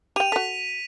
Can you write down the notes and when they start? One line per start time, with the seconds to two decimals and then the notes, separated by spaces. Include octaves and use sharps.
0.16 G4 G5 D#7 F7
0.32 F#4 A4 B6